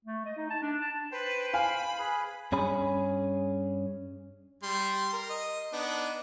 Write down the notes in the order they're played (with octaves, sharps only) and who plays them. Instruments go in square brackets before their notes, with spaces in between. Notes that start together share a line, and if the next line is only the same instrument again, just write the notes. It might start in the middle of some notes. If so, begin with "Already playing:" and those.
[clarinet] A3
D#5
D#4
A5
D4
A5
[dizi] B4 [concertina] C5 G5
[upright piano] F5 G#5 [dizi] B5
[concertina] G#4 B4
[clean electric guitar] G2 C#4 G#4 B5
[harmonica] G3 C6
A#4
D#5
B3 D4 D#4